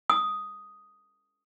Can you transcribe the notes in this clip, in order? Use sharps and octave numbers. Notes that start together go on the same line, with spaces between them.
D#6